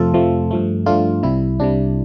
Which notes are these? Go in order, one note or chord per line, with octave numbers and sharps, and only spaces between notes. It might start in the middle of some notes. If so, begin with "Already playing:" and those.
Already playing: F2 C3 F3 A3 F4 A4
F2 C3 F3 A3
G2 F3 A3
G2 F3 A3 D4 F4
C2 C3 G3 E4
C2 C3 G3 D4